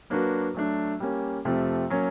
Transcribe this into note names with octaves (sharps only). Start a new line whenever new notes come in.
F#3 A#3 D4 F#4 B4
F#3 A3 D4
G3 A#3 C#4
F2 C3 F3 A3
F#3 A#3 C#4